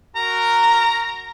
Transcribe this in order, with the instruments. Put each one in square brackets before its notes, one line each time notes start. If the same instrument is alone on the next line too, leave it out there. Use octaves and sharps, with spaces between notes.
[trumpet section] F#4 A#4 [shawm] A#5